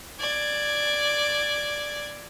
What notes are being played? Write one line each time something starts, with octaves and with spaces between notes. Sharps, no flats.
D5 G#6